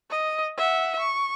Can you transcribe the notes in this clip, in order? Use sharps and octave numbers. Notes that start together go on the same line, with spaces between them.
D#5
E5 F#5
C#6